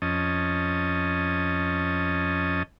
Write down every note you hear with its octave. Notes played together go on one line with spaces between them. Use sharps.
F2 C#4 D#5 A5